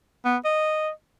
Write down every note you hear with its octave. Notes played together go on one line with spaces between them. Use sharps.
B3
D#5